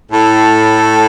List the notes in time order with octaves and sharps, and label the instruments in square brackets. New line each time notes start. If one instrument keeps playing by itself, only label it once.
[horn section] A2 [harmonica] A4